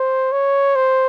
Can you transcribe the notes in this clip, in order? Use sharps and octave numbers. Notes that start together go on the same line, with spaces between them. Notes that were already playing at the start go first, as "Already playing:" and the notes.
Already playing: C5
C#5
C5